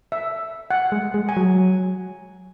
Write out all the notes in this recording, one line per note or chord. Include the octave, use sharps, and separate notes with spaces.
E5
F#5
G#3
G#3
G#5
F#3